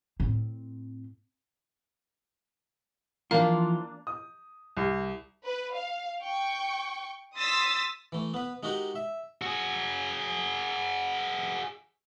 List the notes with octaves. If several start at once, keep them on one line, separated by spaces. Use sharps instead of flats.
A2 C4
E3 F3 A#3 D4 F4 F5
D#6
C2
B4
F5
G5 C#6
C6 D#6 E6 A6 B6
E3 A3
B3 B4
G#3 D#4 F#4 G4 A#4 F#5
E5
F#4 G#4